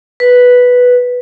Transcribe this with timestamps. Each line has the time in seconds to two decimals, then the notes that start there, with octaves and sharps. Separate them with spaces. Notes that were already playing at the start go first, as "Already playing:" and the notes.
0.20 B4